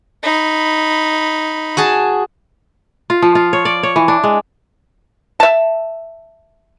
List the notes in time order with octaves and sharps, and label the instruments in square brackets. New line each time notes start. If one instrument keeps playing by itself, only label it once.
[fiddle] D#4 B5
[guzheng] F#4 G#4 A5
[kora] F4
F3
F4
C#5
D5
C#5
E3
D4
G#3
[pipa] E5 A5